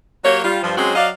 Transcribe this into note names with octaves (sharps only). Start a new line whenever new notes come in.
F#3 A#3 G4 C#5
G3 F4
G2 F3
F#3 G#3 C4 C#4 F#4
F#3 D5 D#5 F5